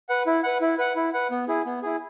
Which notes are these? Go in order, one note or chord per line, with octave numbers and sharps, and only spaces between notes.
B4 F#5
E4
B4 F#5
E4
B4 F#5
E4
B4 F#5
B3
E4 G#4
B3
E4 G#4